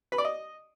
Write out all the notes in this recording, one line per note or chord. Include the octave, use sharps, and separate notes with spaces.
B4
D5
D#5